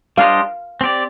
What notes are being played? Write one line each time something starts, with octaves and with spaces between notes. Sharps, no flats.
G3 D4 G4 C5 D#5 F5
C4 G4 D5